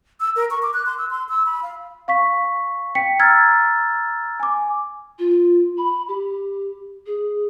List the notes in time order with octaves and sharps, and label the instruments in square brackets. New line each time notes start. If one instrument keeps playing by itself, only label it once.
[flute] E6
A#4
C#6
D6
F#6
C6
E6
C6
E6
B5
F5
[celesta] F5 C#6 B6
G5 B6 C#7
A#5 E6 F6 G#6 A6
G#5 D6
[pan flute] F4
B5
G4
G#4